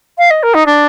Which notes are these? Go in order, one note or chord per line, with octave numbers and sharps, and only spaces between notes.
F5
D#5
A#4
D#4
D4